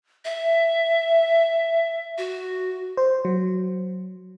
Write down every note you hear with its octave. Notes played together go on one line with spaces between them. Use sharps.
E5
F#4
C5
F#3